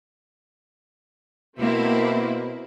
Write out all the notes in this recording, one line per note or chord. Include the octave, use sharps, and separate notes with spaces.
B2 A#3 C4 E4